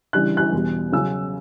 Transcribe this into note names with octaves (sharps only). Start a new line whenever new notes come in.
C#3 E3 G3 D4 F#6
F#6
E2 B2 G3
C#3 F#3 C#4 E6